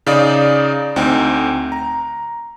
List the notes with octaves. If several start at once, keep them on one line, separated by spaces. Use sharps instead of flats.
C#3 D#4 D5 F5 D#6
D2 C4 D#4 G5
A#5